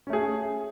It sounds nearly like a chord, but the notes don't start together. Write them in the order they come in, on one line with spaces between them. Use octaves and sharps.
C#4 A3 G#4